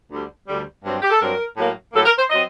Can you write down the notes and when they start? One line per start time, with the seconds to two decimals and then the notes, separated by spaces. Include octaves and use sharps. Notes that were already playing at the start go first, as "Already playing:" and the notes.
0.10 D2 D3 G3
0.47 D2 D3 G3
0.83 G2 F#3 C4
1.01 G4
1.10 A4
1.20 G2 F#3 C4 A#4
1.56 A2 F#3 A#3
1.93 A2 F#3 A#3 A4
2.05 A#4
2.17 C5
2.30 F#3 C4 D#5